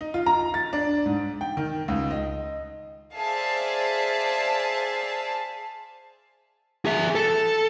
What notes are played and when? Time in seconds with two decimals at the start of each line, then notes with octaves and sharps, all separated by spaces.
0.01 D#4
0.14 F4
0.26 A#5
0.54 A6
0.73 D4
1.06 G#2
1.41 G5
1.57 D#3
1.88 C#2
2.11 D#5
3.15 G#4 C5 D5 E5 F5 A5
6.85 G#4 E5
7.15 A4